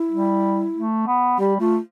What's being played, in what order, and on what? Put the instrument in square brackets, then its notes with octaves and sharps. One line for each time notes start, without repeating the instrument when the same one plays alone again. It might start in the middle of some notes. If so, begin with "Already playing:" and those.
Already playing: [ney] E4
[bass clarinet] G3
A3
B3
[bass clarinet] G3 [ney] G4
[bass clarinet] A3 [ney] F4